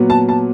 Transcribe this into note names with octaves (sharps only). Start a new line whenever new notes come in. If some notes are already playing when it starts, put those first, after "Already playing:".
Already playing: A#2 F#3 B3
A5
A5